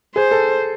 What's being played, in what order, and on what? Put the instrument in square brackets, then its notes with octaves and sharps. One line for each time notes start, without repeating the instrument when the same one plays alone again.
[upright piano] G#4 [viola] C5
[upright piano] A4